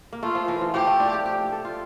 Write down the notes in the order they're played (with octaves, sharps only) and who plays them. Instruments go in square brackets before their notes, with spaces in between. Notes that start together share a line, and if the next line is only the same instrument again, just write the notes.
[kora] A#3
[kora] A3 [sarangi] F4
[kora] F3
E3
F3
[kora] F3 [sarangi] G4
[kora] A3
D4
G4
G4
A4
F4